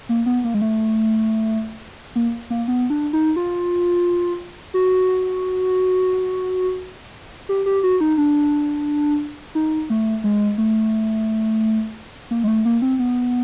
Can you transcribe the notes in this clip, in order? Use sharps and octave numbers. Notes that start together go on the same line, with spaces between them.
A#3
B3
A#3
G#3
A3
A#3
A#3
B3
D4
D#4
F4
F#4
G4
G4
F#4
D#4
D4
D#4
A3
G#3
A3
A#3
G#3
A3
A#3
C4
B3